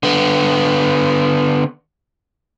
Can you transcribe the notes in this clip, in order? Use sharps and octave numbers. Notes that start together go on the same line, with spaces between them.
D3 B3